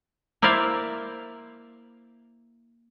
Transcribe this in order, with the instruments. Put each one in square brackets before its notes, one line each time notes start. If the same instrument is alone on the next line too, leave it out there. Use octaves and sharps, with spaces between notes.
[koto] A#3 E4 C5 D5 E5 F5